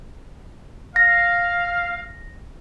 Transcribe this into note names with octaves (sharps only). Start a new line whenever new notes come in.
F5 A#6